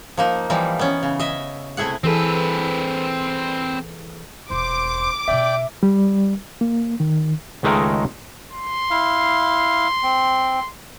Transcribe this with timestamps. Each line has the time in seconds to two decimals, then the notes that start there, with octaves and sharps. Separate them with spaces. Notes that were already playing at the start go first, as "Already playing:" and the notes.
0.17 F3 A#3 D#4
0.50 E3 F3 G3 D#4
0.79 B3 C#4
1.03 C#3
1.20 D#5 E5
1.77 C3 A3 E4 G#4 F#5
2.04 E3 C4 G#4 A4 B4
4.50 E1 E2 C5 D6
5.28 B2 C#4 D5 E5 G5
5.83 G3
6.61 A#3
7.00 D#3
7.63 C#2 D#3 G#3 A3 D#4 A#4
8.53 C6
8.90 E4 F5
10.03 C4